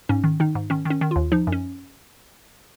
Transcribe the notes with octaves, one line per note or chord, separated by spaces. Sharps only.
G#2 C#4
D#3
D#3 D#4
G#2
D#3 C#4
D#3 C#4
D#3
D#2 F4
F3 D#4
F#2
C#4